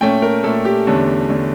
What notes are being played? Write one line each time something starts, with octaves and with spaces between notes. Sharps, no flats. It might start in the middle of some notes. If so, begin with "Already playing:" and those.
A#2 A3 C#4 G5
A#4
A#2 A3 C#4 A4
G4
E2 D3 A3 C#4
D3 A3 C#4